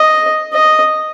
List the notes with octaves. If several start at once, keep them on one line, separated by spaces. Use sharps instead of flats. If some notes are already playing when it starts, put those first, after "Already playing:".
Already playing: D#5
D#5